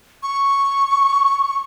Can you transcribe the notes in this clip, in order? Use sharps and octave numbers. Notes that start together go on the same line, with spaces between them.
C#6